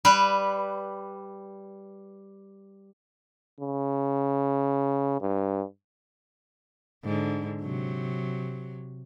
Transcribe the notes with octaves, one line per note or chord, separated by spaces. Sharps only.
G3 B4
C#3
G2
G#2 D3
C3 F#3